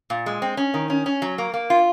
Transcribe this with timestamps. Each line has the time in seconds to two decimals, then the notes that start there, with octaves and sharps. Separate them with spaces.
0.10 A#2
0.26 G#3
0.42 C4
0.57 C#4
0.74 D#3
0.90 C#4
1.06 C#4
1.22 F#3
1.38 A#3
1.54 A#3
1.70 F4